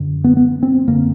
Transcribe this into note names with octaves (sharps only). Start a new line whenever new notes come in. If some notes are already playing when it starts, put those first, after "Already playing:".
Already playing: F#2 D3
B3
B3
C4
F#2 D3 A#3